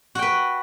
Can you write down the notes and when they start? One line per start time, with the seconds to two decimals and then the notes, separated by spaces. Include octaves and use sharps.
0.15 F#4
0.19 G5
0.22 B4